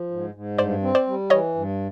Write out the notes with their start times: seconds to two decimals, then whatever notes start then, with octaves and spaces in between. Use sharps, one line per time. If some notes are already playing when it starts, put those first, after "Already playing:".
Already playing: F3
0.11 G#2
0.34 G#2
0.58 G2 C5 D5
0.82 C4
0.95 C5 D5
1.07 G3
1.30 E3 C#5 D#5
1.55 G2